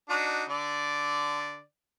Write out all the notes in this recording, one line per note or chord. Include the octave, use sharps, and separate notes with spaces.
D4 D#4 F#4
D3 D5